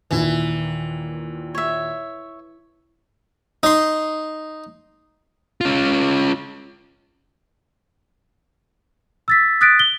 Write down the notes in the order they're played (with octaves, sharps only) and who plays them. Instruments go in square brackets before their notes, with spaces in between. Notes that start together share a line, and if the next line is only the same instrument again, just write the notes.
[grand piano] D#2 A#2 [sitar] E3
[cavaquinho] C#5 E5
[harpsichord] D#4 C6
[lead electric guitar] C#4 F4
[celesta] E6 A6 B6
D#6 F#6 A6 B6 D7
G7